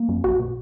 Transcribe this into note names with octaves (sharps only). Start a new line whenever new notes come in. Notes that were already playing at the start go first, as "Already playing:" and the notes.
Already playing: A#3
F#2
B1 F#4
B2